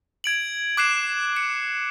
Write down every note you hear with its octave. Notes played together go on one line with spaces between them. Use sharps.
G#6 D7 F#7
D6 F#6 C7 E7
C#7